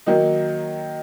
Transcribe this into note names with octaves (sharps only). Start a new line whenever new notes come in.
D#3 F#3 A#3 D#4